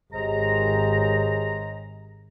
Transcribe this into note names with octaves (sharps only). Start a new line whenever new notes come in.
G#1 G4 G#4 C5 C#5 D#5 A#5